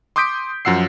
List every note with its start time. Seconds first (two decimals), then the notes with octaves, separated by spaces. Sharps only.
0.16 C6 D6 D#6 G6 B6 D7
0.65 F#2 F3 F#5 E6 C7